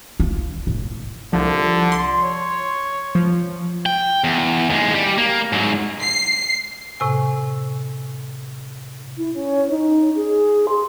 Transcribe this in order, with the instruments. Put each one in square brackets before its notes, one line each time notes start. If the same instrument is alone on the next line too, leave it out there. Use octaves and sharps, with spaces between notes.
[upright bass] F4
A2
[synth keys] C2 F3 [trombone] D3
[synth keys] C6
[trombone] C#5
[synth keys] F3
[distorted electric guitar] G5
E2
D#2 G#3
G3 G4
A#3
G#2 F#3
[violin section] C7
[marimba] A2 C3 G#5
[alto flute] E4
C#4
D#4
G#4
C6